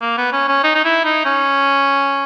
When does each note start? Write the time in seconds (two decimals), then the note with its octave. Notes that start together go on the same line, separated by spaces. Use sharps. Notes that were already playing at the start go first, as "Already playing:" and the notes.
0.01 A#3
0.17 B3
0.32 C#4
0.48 C#4
0.63 D#4
0.75 D#4
0.84 E4
1.04 D#4
1.25 C#4